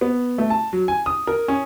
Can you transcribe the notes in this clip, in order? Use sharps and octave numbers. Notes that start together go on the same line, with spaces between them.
B3
A3
A5
F#3
G#5
D#6
A#4
C#4